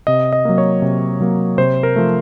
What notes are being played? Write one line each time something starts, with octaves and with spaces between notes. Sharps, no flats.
C3 D#5
D#5
F#3 A#3
C#5
C3
F#3 A#3
C3 C5
A#4
F3 A3